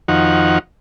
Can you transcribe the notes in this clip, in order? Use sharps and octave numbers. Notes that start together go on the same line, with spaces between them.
F2 D#3 F3 D#4 F#4 F#5